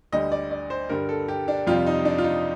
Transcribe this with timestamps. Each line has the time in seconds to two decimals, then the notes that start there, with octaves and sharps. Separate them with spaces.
0.12 D2 D3 G3 D#5
0.32 D5
0.51 D5
0.70 C5
0.89 G2 D3 G3 A#4
1.09 A4
1.28 G4
1.48 D4
1.67 F2 C3 G3 F4
1.86 D#4
2.05 D4
2.18 F4
2.24 D#4